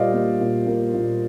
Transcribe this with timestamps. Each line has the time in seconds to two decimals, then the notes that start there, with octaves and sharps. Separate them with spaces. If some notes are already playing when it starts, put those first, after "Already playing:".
Already playing: A#2 G3 A#3 C5 D5 D#5 F5
0.14 A#3
0.41 A#2
0.67 A#3
0.94 A#2